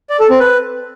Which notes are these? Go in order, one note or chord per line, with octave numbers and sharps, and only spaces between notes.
D5
A4
C4
B4